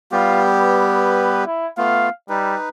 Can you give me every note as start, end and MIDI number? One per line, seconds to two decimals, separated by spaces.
0.12 1.45 55
0.12 1.45 59
0.12 0.42 65
0.12 1.45 67
0.50 1.41 71
1.45 1.67 64
1.78 2.09 57
1.78 2.09 59
1.78 2.09 65
1.78 2.10 77
2.29 2.55 55
2.29 2.69 63
2.29 2.69 71